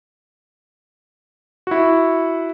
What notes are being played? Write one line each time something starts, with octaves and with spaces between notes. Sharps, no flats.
E4 F#4